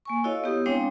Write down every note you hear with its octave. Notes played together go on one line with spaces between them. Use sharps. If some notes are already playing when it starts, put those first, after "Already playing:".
A#3 G#5 C#6
E4 F#4 A4 C#5 D#5 F5
B3 E4 G4 D#6
G#3 C4 D4 C#5 F5 G5